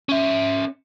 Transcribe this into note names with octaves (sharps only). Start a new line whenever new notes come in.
C#4 E5